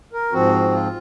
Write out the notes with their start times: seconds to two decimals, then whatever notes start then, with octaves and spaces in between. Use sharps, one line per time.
0.13 A#4
0.32 G#2 F3 C4 F#4
0.72 F4